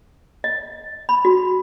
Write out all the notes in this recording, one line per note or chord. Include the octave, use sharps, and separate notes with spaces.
D#5
B5
F#4